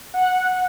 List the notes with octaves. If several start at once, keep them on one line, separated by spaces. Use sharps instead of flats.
F#5